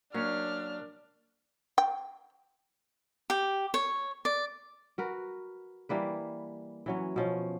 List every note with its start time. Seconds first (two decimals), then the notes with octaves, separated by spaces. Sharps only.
0.14 F#3 A#3 C#4 D4 C#5 F6
1.78 G5
3.30 G4
3.74 C#5
4.25 D5
4.98 F#4 A#4 B4
5.89 E3 G3 A#3 B4
6.86 E3 F#3 C#4
7.16 B2 F3 C#4